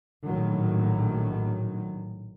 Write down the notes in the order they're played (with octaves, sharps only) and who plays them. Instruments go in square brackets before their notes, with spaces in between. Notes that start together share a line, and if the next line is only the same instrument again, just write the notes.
[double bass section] A#1 A2 D#3 F#3